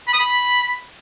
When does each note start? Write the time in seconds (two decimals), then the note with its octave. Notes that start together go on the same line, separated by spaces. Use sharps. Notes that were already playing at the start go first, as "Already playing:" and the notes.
0.08 B5
0.14 D#6
0.19 B5